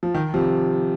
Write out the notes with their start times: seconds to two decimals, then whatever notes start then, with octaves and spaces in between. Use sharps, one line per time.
0.03 F3
0.15 D#3
0.34 C3 F3